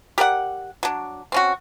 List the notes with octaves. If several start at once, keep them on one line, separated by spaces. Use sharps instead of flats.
G4 A#4 D5 F#5
F#3 D4
C4 C#4 F#4